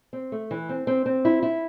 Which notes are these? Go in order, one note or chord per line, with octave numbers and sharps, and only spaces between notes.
C4
A3
E3
C4
C4
C4
E4
E4